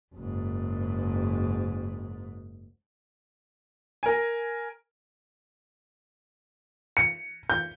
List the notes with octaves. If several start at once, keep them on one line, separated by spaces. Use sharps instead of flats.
F#1 G#2
A#4 G#5
C#7
G6